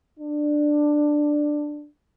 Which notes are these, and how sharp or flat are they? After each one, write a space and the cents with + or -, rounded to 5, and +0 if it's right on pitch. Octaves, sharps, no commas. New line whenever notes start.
D4 +10